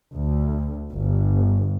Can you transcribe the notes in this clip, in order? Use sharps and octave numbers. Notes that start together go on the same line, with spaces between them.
D2
G1